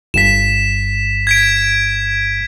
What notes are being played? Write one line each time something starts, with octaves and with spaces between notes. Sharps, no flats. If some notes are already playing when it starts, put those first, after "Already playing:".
G1 G2 B6 E7
G#6 B6 D7